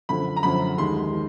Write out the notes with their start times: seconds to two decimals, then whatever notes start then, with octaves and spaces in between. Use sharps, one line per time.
0.09 F#2 D3 F3 B5
0.36 A#5
0.43 F#2 D3 F3 B5
0.78 D#2 D#3 G#3 C6
1.13 D#3